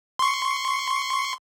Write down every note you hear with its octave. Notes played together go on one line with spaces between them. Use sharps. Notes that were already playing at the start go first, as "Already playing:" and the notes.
C6 C#6